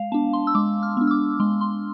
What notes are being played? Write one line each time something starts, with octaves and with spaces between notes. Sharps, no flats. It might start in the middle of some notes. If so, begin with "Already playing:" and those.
Already playing: G#3 F5
B3 D4 A5
C6
E6
G#3 D6
F6
B3 D4
E6
D6
G#3 C6
C6